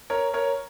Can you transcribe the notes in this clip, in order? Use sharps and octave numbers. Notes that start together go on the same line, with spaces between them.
A#4 C#5
A#4 C#5